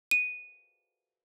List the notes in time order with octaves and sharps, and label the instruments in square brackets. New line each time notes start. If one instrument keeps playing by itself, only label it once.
[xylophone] D#7